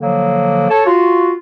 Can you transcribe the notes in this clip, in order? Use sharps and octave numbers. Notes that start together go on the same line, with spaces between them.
D3 F3 F#3 A#3
A4 C#5 A5
F4 F#4